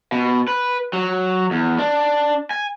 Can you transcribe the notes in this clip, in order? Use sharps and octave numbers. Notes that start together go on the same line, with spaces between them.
B2
B4
F#3
E2
D4
G#5